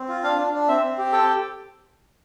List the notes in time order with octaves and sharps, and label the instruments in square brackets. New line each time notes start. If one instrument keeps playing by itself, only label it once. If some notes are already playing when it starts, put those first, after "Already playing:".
Already playing: [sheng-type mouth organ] C4
F4
D4 F5
D4
D4
C4 E5
C4
G4
A4 G5